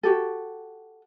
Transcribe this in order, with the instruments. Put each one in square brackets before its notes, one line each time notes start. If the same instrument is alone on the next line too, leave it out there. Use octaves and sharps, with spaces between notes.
[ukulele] F#4 G4 A4